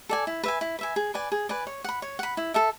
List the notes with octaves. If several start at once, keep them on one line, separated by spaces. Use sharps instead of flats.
A4 D5 G#5
E4
B4 E5 G#5
E4
B4 E5 G#5
G#4
B4 D5 G#5
G#4
B4 D5 G#5
C#5
F#5 B5
C#5
F#5 B5
E4
A4 E5 A5